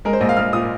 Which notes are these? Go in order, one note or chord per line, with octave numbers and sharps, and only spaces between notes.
G#3 A#4
C5
A#1 D#5
F5
A#1 F6
A#2 D#6